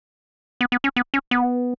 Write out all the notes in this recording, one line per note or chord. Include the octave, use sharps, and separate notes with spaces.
B3
B3
C#4
B3
C#4
B3